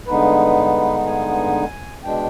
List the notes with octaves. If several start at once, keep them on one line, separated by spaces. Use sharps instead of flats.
G2 D3 G#3 B3 D#4 B4
G#5
B2 G#3 D4 G5